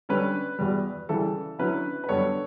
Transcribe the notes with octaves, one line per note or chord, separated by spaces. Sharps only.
D3 G3 C#4 B4
E2 B2 G3
C#3 E3 G3 A4
D3 F#3 C#4 E4 B4
B4
F#2 D3 G3 B3 A4 C#5